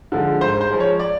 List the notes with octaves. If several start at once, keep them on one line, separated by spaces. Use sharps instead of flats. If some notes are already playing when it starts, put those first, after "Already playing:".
D3 F3 G#3
G#2 C5
C5
F3 G#3
C#5
D5